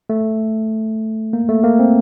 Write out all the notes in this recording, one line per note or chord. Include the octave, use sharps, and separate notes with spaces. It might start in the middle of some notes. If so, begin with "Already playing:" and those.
A3
A#3
A3
A#3
C4